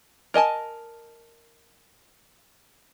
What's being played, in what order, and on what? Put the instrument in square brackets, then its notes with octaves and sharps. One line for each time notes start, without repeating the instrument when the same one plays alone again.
[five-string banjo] A#4 D#5 G#5 A5